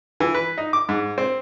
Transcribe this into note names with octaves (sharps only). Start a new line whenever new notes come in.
E3
B4
D#4
D6
G#2
C4